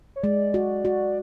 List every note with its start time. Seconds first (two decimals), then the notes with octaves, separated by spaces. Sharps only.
0.16 C#5
0.23 G#3 D5
0.54 F#4
0.85 F#4